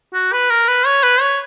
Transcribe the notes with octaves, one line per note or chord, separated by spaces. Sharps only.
F#4
B4
A#4
B4
C#5
B4
C#5